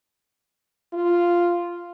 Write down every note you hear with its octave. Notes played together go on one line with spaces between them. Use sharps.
F4